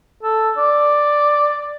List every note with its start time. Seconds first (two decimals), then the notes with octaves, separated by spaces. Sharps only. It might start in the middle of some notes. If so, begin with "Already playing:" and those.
0.23 A4
0.58 D5